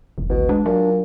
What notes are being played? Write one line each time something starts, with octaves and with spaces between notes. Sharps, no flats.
E1
G#1 D2 B2
G#3 D4
A#2 F#3